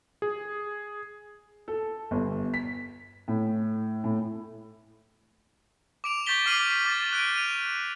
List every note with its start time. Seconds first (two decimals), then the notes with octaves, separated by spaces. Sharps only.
0.22 G#4
1.68 A4
2.11 G1
2.54 B6
3.28 A2
4.04 A2
6.04 D6 D7 F7
6.26 C#6 G6 A6 B6 G7
6.46 D6 F6 C7 D#7 F#7
6.85 D6 A6 E7
7.13 F#6 D7 D#7
7.36 D#7 F7